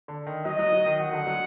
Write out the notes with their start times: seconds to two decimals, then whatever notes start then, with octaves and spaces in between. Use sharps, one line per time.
0.08 D3
0.27 D#3
0.45 F#3 D#5
0.59 F#3
0.72 F#3
0.86 D#3
1.00 D#3 F#5
1.13 D3
1.27 F#3